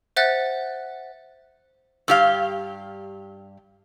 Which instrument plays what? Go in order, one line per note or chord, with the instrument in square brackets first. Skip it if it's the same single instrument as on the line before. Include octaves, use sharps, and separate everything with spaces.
[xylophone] C5 E5 F#5 F#6 A6
[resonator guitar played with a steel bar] G2 G4 F5